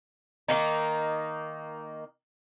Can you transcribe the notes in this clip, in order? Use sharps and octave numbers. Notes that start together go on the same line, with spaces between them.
D#3 A#3 D#4